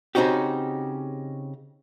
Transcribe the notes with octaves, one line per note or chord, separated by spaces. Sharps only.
C#3 C4 C#4 D#4 F#4 G4